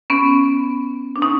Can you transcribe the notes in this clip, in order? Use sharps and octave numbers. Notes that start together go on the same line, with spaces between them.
B3 C#4
D4
C#4 D#4